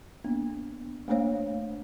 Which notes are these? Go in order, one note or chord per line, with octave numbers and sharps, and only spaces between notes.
A#3 B3 D4
A3 A#3 D4 C5 C#5 F5